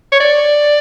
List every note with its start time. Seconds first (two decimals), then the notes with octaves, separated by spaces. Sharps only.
0.12 C#5
0.20 D5